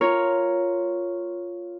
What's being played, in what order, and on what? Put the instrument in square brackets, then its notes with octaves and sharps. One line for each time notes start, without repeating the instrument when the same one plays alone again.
[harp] F4 A#4 C#5